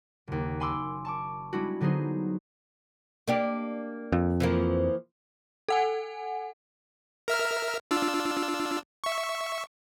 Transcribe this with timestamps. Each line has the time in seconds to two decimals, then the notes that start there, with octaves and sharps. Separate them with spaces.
0.27 F#1 D#2
0.60 G#5 B5 C6 D6 E6
1.05 A5 C#6 D6
1.53 G3 G#3 B3 D4 E4 F#4
1.80 D3 F#3 B3 D#4 G#4 C5
3.28 A#3 D4 G4
4.12 F2
4.40 E3 F3 A#3
5.68 A4 F#5 G#5
7.28 A#4 E5 F6
7.91 D4 F4 E6
9.04 E5 C#6